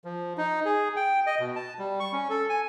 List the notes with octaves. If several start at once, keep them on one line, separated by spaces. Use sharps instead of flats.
F3
D#4
G#4
G5
D#5
B2
A5
G3
C#6
C#4
A4
G#5